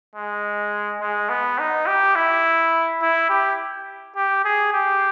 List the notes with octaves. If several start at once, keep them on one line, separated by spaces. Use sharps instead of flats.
G#3
G#3
B3
D#4
G4
E4
E4
G4
G4
G#4
G4